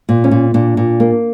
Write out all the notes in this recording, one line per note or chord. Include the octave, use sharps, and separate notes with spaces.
A#2
C#4
A#2
A#2 D4
A#2
A#3